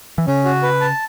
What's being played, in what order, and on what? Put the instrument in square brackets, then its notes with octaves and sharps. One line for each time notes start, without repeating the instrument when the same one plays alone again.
[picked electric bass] E3
[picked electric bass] C#3 [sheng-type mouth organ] C#4
[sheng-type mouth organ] F#4
B4
A5